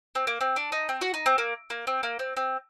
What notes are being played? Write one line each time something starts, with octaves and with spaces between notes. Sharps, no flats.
C4
A#3
C4
D4
D#4
C4
F#4
D#4
C4
A#3
A#3
C4
A#3
C4
C4